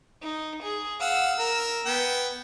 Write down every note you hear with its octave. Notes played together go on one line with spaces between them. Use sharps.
D#4
G#4
F5 F#5 E6
A#4
B3 G5